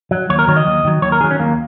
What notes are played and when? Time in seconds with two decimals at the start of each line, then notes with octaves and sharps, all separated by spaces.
0.11 F#3
0.30 D#2 C#5
0.39 A#4
0.48 D#3 F#3 C#5
0.56 D#5
0.66 D#2
0.85 D#3 F#3
1.02 D#2 C#5
1.12 A#4
1.21 D#3 G#4
1.24 F#3
1.31 C#4
1.39 D#2 A#3